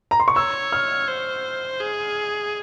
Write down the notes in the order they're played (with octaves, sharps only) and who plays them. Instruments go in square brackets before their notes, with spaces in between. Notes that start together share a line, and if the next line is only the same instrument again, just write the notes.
[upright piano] A#5
C6
C#6
[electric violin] C#5 [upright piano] E6
[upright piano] F6
[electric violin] C5
G#4